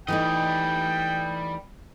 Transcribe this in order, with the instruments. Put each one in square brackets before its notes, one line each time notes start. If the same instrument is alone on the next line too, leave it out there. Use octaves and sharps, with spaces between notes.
[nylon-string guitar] E3 A3 D#4 [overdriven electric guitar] G3 D#5 [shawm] G5